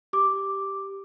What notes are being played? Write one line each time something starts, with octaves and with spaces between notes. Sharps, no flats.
G4 D6